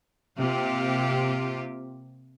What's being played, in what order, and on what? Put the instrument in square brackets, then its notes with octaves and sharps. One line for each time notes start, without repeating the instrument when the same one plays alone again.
[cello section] C3 A#3 F4 G4